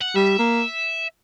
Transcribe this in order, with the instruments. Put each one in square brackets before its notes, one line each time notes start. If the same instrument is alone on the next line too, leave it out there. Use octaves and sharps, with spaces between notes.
[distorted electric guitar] F#5
[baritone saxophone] G3 [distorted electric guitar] E5
[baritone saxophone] A#3